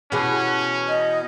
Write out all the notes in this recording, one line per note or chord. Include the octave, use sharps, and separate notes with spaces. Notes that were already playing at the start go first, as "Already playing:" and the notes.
B2 E3 C#4 G#4
D#5